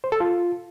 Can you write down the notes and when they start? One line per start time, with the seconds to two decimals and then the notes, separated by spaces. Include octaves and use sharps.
0.04 C5
0.12 A4
0.20 F4